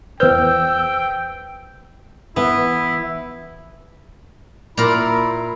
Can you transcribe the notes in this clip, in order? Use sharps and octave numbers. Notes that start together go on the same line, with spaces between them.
E2 B4 C5 G5 E6 G6
E3 B3 E4
A#2 E4 A#4